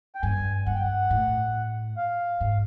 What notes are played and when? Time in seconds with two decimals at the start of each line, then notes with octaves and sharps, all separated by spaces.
0.15 G5
0.22 G2 G#5
0.66 G2 F#5
0.74 G5
0.82 F#5
1.11 A2
1.97 F5
2.41 G#2